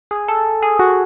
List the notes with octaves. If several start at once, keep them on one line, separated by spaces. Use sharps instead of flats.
G#4
A4
G#4
F#4